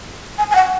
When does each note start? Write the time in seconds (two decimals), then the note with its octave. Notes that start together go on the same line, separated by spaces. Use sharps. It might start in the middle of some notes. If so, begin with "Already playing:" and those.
0.38 G#5
0.51 G#5
0.55 F#5